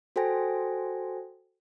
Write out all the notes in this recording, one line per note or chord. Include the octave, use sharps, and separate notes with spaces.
F#4 A4 C5 G5 G#5 A#6